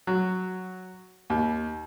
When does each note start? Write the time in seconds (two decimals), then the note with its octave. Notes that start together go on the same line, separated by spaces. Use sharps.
0.07 F#3
1.30 D#2